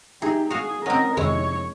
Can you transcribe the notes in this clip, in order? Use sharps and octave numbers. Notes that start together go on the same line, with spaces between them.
D#4 G4 G#4 E5 A#5
F#4 G#4 F5 D#6
C4 C#4 A#4 D#5 F#5 D#6
F2 C3 D#3 G#3 E4 C#5